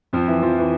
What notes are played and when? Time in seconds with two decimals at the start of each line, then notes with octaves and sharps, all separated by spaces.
0.13 F2 F3
0.28 E3 E4
0.42 F3 F4
0.58 E3 E4